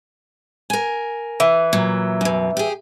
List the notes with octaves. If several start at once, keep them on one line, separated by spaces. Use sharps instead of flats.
A#4 G#5
E3
A#2 F#3
F#2 B2
G4 G#4